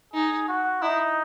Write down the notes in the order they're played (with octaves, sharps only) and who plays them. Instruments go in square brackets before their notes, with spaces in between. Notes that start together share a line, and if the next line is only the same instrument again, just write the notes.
[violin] D#4 [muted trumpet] G#4
[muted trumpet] F#4
[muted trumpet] D#4 [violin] E4